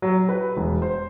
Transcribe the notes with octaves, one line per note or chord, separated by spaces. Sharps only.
F#3
B4
E1
C5